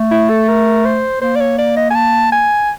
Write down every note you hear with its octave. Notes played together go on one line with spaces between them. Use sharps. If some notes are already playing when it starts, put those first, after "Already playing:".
Already playing: A3
E4
A4
A#4
C5
A#3 C5
D5
C#5
D5
D#5
G#5
A5
G#5